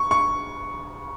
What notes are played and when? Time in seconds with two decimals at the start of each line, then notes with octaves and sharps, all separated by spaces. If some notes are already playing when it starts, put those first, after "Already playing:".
Already playing: C#6
0.11 C#6